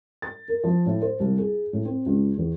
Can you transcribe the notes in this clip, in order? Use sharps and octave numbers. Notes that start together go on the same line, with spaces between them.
A6
A#4
F3
A2
C5
C2
G#4
A2
C4
C#2
E2